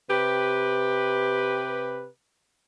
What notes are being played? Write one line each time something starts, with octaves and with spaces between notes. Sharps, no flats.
C3 G4 B4